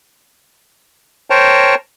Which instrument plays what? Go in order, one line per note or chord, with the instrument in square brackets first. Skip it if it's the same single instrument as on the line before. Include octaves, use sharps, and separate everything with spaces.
[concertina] A#4 C5 C#5 G5 A5 A#5